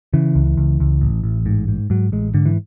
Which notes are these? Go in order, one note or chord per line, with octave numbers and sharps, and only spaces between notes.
C#3 E3
C#2
C#2
C#2
A1
A1
G#2
G#2
G#2 F#3
A1 G#3
G#2 D3
E3